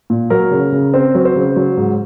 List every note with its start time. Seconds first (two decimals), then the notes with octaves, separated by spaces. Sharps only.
0.10 A#2
0.30 F#3 A#4
0.51 C#3
0.72 C#3
0.94 C4 C5
1.15 F#3
1.25 C5
1.35 C#3
1.56 F#3
1.77 G#2